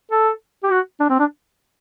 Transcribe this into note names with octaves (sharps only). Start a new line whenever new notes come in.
A4
G4
F#4
D4
C4
D4